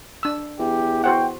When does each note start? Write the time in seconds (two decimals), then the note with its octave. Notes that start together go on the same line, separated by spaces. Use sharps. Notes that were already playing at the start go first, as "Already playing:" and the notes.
0.23 D4 E6
0.59 E2 G4
1.04 F#4 C5 F#5 G5